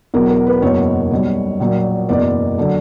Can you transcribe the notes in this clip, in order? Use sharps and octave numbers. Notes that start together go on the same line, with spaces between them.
E2 B2 F#3 A#4
A#4
B4
F#1 E2 B2 F#3 C#5
B1 B2 G3
A#1 A#2 F#3
F#1 E2 B2 D5
D3 F#3